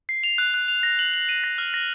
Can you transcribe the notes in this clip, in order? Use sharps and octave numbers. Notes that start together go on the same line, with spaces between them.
C7
F7
F#6
F#6
F7
A#6
F#7
F#7
D#7
A#6
F6
A#6